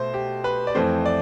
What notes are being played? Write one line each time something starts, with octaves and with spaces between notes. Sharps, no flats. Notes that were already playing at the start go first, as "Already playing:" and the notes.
Already playing: B2 A3 C5
G4
B4
D5
F2 E3 A3 C4 C5
D5